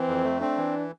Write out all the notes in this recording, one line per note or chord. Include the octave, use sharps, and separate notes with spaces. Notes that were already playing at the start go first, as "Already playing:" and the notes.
Already playing: E3 C4
F2
A3
C4 D4
E3